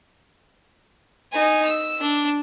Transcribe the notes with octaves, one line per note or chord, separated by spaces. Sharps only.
D#4 G#5
E6
D4